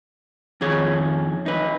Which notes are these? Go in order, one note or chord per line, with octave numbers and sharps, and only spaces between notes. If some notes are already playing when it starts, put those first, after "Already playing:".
F2 D#3 G#4 C#5
D#4 B4